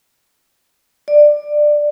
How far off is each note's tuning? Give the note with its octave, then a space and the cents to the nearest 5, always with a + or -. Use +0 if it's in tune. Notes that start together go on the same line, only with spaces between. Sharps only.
D5 +15